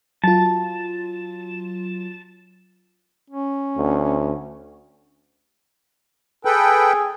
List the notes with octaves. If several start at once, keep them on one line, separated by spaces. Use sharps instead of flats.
F#3 F4 A5
C#4
D2
G#4 A4 B4 G5